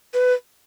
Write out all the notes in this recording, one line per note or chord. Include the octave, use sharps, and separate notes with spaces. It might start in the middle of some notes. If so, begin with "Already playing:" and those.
B4